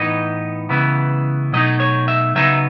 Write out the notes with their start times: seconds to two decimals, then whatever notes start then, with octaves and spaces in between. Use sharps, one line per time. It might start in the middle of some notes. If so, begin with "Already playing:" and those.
Already playing: A2 E3 B3 D#4 D#5
0.69 C#2 C#3 E3 B3 E4
1.53 B2 F#3 A3 D#4 D#5
1.80 C#5
2.08 E5
2.35 C#3 F#3 B3 D#4 E5